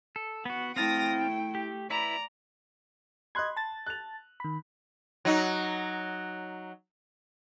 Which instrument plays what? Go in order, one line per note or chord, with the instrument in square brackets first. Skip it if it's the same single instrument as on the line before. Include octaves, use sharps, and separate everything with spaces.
[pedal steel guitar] A4
[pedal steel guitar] B3 F#4 [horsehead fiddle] F#5
[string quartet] A3 D#6 A#6 [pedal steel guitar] C4 F5 A5 [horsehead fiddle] E4 G5
[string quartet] A3
[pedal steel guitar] G4
[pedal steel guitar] E4 B4 [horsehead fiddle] D5 [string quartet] A#5
[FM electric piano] D#5 G#6 [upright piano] B5 C6 F#6
[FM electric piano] A5 A6
[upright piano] F#6 F7
[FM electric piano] D#3 B5
[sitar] F#3 D#4